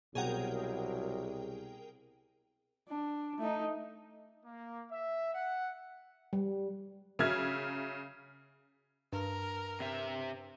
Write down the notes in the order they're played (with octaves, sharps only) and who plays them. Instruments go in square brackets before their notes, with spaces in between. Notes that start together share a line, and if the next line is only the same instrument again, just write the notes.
[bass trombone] C2 [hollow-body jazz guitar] B2 F#5 [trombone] F#3 [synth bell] G#4 A#4 G5
[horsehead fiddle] D4
A3 D#4
[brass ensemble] A#3
E5
F#5
[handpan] G3
[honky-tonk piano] C#3 F#3 E5 F6 G#6
[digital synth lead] G2 [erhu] A#4
[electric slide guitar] C3 E5